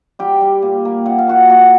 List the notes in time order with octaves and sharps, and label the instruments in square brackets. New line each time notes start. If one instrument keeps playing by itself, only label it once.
[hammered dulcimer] G3 G4 G5
G3
A#2
A#3
A#2 F#5
F5
A#3 F#4 F#5
A#3 F#4 F#5